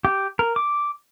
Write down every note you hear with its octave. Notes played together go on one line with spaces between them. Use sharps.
G4
A#4
D6